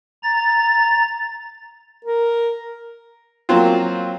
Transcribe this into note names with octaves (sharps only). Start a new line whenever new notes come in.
A#5 A6
A#4
F#3 A#3 C4 F4